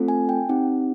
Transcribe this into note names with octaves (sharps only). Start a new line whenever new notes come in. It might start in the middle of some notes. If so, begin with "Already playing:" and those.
Already playing: A3 C4 F4 A4
G#5
G5
C4 D#4 G4 F#5